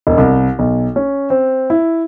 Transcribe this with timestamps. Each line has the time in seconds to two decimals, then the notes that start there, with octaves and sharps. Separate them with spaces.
0.07 E1
0.18 C2
0.59 B1
0.96 C#4
1.30 C4
1.70 E4